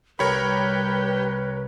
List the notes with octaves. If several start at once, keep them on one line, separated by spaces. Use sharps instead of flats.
C2 G4 A#4 B4 C#5 B5